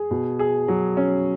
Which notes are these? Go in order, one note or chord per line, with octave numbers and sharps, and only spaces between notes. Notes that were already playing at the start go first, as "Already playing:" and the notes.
Already playing: G#4
B2
G#4
F#3
C#4